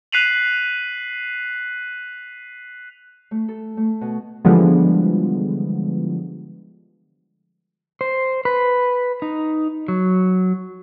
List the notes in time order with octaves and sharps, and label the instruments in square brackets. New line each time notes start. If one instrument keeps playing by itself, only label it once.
[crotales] F#6 B6 C7 D#7 F7 F#7
[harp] A3
A4
A3
B2
[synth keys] D3 E3 F3 G3 G#3 B3
[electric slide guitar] C5
B4
D#4
F#3